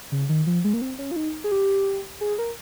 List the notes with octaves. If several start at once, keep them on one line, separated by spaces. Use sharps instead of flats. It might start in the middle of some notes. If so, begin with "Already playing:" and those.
C#3
D#3
F3
G#3
A#3
C4
C#4
F4
D#4
G#4
G4
G#4
A#4